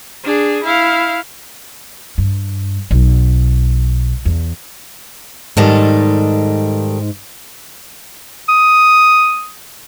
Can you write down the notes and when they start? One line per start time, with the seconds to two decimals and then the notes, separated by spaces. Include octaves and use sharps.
0.24 D4 G#4
0.64 E4 F5
2.18 G2
2.91 B1
4.25 E2
5.57 G#2 D#3 G3 A4
8.49 D#6